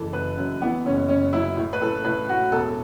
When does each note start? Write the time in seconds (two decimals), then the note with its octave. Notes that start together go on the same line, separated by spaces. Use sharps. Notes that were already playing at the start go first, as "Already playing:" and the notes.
Already playing: F#1 E3 A4
0.13 F#1 B4
0.37 F#2
0.62 E3 B3
0.85 F#1 C#4
1.09 F#1 C#4
1.33 F#2 E4
1.57 A2
1.73 B4
1.82 A2 A4
2.05 A2 B4
2.28 A2 F#4
2.52 E1 A4